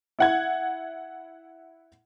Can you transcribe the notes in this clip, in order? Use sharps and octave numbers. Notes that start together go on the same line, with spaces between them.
E4 F#5 G#6